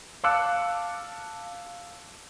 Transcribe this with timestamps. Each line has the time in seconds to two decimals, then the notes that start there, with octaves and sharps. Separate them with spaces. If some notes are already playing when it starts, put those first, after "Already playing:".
0.24 F5 A5 D6 E6 F#6 C#7